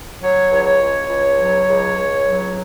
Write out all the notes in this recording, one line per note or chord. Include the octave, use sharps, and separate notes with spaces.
F#3 C#5
C#2
C#5
C#2
C#2
F#3
C#2
C#2
F#3